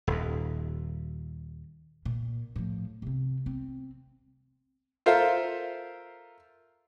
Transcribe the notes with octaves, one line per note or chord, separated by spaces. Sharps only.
D#1 D#2
A#2
A2 F3
C3 C4
C4
F4 A4 A#4 C5 E5 F5